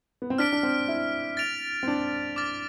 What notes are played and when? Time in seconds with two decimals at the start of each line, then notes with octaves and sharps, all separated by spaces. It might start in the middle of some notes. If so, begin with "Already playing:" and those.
0.22 B3
0.30 C4
0.38 D4 F6 B6 D7
0.53 D4
0.63 C4
0.88 E4
1.37 A6 D7 F7
1.83 C4
1.88 D4
2.36 D6 F6 A6